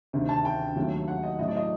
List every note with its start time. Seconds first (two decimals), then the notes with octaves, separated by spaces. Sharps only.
0.13 D2 C3 D#3
0.29 A5
0.45 G5
0.76 D#2 D#3 F#3 A3
1.08 F#5
1.23 D#5
1.39 A2 F#3 A3 D#5
1.48 D5
1.56 D#5